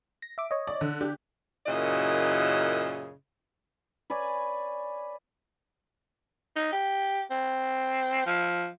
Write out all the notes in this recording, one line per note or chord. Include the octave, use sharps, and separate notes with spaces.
A#6
E5 D6
C#5 D#5
D5
D3
D4 G4
F#2 A#2 C#3 E4 D#5
B4 C#5 D5 G#5
D#4
G4
C4
F3